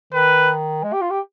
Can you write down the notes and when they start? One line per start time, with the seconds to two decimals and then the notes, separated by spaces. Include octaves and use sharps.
0.13 D#3 B4
0.83 G#3
0.93 G4
1.01 F4
1.11 G4